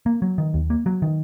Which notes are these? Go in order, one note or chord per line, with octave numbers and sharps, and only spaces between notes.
A#3
F#3
D#3
D#2
A#3
F#3
D#3